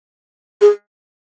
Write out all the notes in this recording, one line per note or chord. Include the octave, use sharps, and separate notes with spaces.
G#4